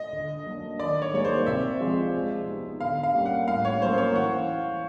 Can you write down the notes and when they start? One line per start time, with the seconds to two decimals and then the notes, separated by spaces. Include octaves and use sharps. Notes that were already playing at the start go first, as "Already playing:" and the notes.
Already playing: D#5
0.13 D3
0.46 F#3 A#3 D4
0.80 D#3 D5
1.02 C#5
1.13 F#3 A#3 D#4 G#4 C#5
1.24 C5
1.46 C3 E5
1.80 F3 G#3 C4 F4
2.13 G#3
2.47 B3 D#4 G4
2.80 D3 F5
3.03 F5
3.15 G3 A#3 C#4
3.26 F#5
3.48 A2 F5
3.65 C#5
3.82 F#3 A#3 C#4 C5
3.98 C#5
4.15 E3 F#5